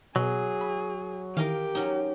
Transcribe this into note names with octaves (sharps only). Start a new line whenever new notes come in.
B2 F#3 G#4
B5
D#3 E3 G4 A#4 D#5 F5
F#3 C#4 D#4